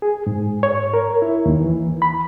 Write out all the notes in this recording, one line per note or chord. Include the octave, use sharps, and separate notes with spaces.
G#4
G#2
C#5
A#4
E4
D#2
E3
B5